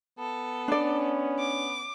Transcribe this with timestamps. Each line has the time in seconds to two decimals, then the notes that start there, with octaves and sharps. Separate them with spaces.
0.19 B3 A4
0.68 C#4 D4 D5
1.39 D6